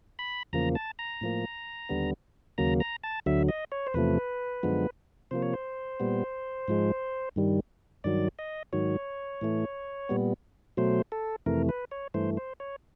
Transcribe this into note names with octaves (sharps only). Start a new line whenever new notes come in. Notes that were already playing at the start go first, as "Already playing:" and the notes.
B5
E2 C#3 F3 A#3 A#5
A5
A#5
A2 F3 A#3
D#2 D3 G3 B3
D#2 C#3 F#3 A#3 A#5
A#5
A5
D2 D3 F#3 E5
D#5
C#5
C5
E2 C3 F3 A3 B4
F#2 D3 F3 G#3 B3
C3 F3 A#3 C5
C#5
C5
A#2 G3 B3
G#2 F3 G#3
G2 D#3 G3
G2 D#3 F#3 D5
D#5
G#2 D#3 F#3 C#5
A2 E3 A3
A#2 G3 B3
B2 F#3 A3 C5
A4
F2 C3 E3 A3 A#4
B4
C#5
G2 E3 A3 C5
C5
C#5